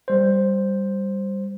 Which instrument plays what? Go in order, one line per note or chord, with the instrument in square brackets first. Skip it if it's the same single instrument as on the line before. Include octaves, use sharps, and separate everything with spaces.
[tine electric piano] G3 C5